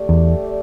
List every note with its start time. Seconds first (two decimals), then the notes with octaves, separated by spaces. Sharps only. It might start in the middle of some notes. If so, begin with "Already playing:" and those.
Already playing: A3 G4 D5
0.09 E2